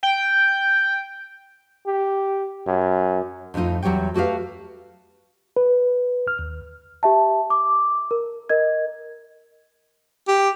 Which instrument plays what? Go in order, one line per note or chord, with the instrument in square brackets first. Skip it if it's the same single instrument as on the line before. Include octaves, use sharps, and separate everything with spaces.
[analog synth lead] G5
[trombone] G4
F#2
[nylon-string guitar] F2 A2 A3 D#4 F4
E2 F#3 G3 C#5 G5
A3 F#4 G4 B4 F5
[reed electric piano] B4
F6
D#2
[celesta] G4 E5 A5
D6
A#4
A#4 D#5 G#6
[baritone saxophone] G4